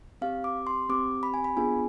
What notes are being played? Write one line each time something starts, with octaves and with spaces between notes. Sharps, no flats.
C4 G4 F5
D6
C6
C4 G4 D6
B5
G#5
B5
B3 D4 F4 G#4 G#5